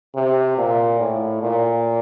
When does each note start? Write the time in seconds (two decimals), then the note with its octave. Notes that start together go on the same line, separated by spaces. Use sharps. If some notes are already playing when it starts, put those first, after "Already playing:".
0.15 C3
0.58 A#2
1.00 A2
1.42 A#2